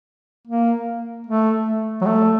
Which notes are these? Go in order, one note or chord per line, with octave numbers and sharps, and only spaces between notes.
A#3
A3
F#3
A3